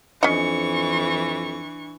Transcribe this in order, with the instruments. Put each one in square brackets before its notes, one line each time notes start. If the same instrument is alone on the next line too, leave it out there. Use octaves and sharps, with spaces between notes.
[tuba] F2 [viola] E3 C#6 [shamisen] C#4 D#5 [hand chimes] D4 C#7